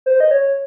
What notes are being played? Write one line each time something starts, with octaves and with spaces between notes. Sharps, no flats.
C5
D#5
C#5